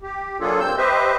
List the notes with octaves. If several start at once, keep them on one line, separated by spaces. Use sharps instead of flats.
G4
F#3 A#3 D4 F4 G#4 A4
A#2 G3 A#3 C4 E6 G6
G4 B4 C5 D#5 E5